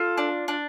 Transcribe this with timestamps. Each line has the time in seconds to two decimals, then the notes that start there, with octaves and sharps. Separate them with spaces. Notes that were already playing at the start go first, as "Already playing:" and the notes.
Already playing: F4 A4
0.18 D4
0.48 D4